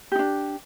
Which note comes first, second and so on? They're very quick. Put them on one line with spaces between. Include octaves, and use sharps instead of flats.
G4 D#4 D4